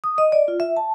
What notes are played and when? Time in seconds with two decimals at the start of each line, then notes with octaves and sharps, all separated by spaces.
0.04 D#6
0.18 D#5
0.32 D5
0.48 F4
0.60 E5
0.77 A5